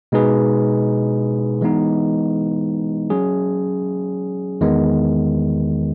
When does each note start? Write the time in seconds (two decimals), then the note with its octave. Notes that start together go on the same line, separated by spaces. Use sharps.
0.12 B2 G#3 D#4 G#4 B4
1.61 E3 G#3 B3 D#4
3.10 F#3 C#4 G#4
4.61 E2 D#3 G#3 B3